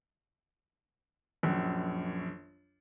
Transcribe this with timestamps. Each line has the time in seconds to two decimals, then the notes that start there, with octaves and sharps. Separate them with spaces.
1.43 A#1 F#2